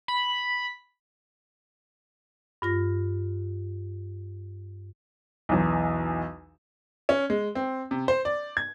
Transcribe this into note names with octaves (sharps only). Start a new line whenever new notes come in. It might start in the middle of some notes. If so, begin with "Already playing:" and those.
B5
G2 F4 A#6
B1 E2
C#4
G#3
C4
C3
C5
D5
G#6